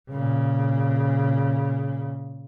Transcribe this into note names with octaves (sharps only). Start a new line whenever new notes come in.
A#2 C#3